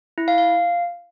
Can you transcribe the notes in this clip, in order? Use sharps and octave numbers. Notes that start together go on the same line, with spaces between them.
E4
F5
F5